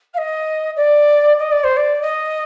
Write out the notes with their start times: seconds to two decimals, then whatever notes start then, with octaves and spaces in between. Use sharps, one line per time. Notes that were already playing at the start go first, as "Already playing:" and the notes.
0.14 F5
0.17 D#5
0.76 D5
1.38 D#5
1.51 D5
1.63 C5
1.76 D5
2.02 D#5